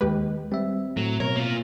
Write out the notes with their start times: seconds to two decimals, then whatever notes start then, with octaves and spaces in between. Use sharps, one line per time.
0.01 D#2 G#3 G4 B4
0.52 G3 C4 E5
0.97 A2 F#3
1.20 B2 A#4 C#5
1.36 A#3 F4